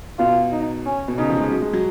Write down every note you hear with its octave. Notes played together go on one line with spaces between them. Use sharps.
B2 F4
D#4
C#4
B2
C#3 D#4
F3
G#3
F#3
G#3
F#3